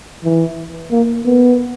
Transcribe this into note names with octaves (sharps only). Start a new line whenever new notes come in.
E3
A#3
B3